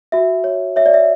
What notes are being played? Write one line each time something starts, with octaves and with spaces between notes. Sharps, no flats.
F#4 E5
C#5
C#5 E5
D5
E5